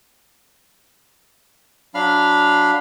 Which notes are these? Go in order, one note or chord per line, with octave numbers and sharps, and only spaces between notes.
F#3 D4 F5 B5 F6